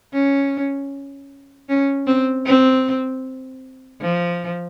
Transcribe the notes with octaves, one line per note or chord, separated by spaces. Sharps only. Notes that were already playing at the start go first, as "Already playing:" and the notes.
C#4
C#4
C4
C4
F3